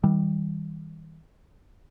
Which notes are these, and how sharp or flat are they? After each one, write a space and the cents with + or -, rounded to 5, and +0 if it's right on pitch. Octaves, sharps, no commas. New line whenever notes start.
D#3 +40 G3 +0